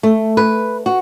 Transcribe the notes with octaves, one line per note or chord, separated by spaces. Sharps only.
A3
B4
F#4